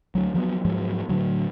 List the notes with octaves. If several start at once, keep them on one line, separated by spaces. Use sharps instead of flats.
D2 F#3
F3 F#3 A3 B3
G#2 F3 F#3 G#3
A2 D3 F#3